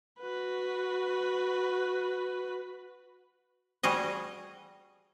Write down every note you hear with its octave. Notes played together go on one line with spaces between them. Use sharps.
F#4 B4
G3 F#4 G#4 D#5